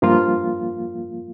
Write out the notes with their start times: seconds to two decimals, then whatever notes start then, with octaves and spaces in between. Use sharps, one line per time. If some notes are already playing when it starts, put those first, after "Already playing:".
0.02 G2 F3 A#3 F4